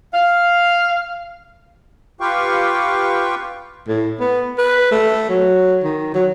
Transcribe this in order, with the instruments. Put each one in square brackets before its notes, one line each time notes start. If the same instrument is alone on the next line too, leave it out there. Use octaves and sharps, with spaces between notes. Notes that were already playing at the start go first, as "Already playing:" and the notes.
[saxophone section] F5
[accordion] F4 G4 B4 F5 G5 C#6
[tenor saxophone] A2
B3
B4
A3
F#3
D#3
F#3